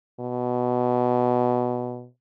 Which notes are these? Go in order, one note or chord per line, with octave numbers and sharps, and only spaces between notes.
B2